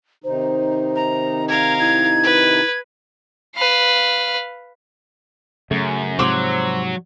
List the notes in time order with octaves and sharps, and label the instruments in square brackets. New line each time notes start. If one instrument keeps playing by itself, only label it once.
[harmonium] C3 D#3 D#4 [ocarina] C5
[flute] A#5
[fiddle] A#4 F5 [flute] G#6
[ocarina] E4 [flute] G#6
[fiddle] B4
B4 F5
[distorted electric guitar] F#2 [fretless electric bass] C#3 A3
[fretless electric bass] G#2 C3 F3 [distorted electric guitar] F#3 [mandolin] C5 D6 E6